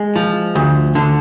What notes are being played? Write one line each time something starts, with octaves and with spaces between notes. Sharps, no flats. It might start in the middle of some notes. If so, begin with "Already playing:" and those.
Already playing: G#3
F3
D2
D3